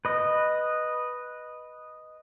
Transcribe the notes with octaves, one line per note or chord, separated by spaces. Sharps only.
B4 D#5